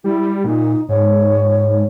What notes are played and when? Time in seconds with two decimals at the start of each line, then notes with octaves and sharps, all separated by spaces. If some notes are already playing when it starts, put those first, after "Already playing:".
0.04 G3 E4
0.44 A#2 D#4
0.89 G#2 C#5